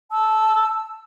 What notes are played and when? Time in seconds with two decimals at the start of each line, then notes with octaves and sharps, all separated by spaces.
0.12 A5 E6